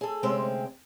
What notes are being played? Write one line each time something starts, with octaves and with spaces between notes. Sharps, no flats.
G#4 A4
D2 C3 G#3 C4 C#4 G5